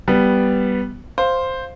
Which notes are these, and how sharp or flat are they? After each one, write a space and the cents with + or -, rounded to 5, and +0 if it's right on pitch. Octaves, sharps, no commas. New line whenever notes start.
G3 +0 B3 +0
C5 +0 F5 +0